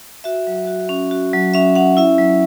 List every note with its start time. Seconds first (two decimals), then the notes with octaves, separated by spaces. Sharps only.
0.24 F#4 E5
0.47 F#3
0.67 F#4
0.89 C#4
1.11 F#4
1.33 F#3
1.54 C#4 E5
1.75 C#4 F#5
1.97 E4 E5
2.18 F#3